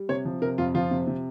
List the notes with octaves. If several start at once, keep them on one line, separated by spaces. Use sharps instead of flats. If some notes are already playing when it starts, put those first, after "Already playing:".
Already playing: G3
C3 C#5
F3
C3 A#4
F2 F4
F3 F4
C3
C3